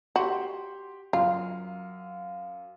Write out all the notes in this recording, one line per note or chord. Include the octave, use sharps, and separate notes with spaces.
F#4 G4 C6
F#2 F4 F5